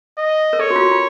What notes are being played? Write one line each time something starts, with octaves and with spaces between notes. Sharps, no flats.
D#5
A#4
A4 C#5
F#4
F4
F#4
F4